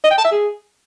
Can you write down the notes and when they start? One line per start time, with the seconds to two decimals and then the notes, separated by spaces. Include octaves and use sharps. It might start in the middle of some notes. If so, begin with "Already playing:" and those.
0.04 D#5
0.11 G5
0.18 A5
0.24 E5
0.31 G#4